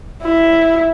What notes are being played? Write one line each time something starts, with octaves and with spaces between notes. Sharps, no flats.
E4